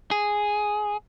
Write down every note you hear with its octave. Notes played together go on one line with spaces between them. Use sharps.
G#4